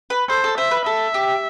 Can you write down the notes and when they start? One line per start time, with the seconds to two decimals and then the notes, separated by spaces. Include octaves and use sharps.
0.10 B4
0.29 A4 C5
0.44 A4
0.58 C5 E5
0.71 B4
0.85 A4 E5
1.14 G4